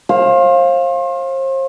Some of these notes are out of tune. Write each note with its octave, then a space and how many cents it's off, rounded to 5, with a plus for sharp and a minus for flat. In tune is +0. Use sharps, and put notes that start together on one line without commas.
C5 +40 F5 +0